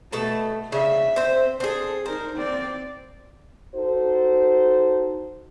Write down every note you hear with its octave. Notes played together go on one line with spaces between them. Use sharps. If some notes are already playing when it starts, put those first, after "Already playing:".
B2 A3 A4 A5
C#3 E5
C4 C5
C4 G#4 A4
D#4 A#4 C5
C4 D5
D#4 F#4 A4 C5